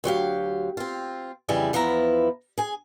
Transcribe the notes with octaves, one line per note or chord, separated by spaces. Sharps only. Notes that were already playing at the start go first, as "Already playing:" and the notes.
D2 F#3 G4 F5
C4 F4
F2 C#3 E3 G3 G#4 E5
E2 F3 B3 E4 A#5
G#4 G#5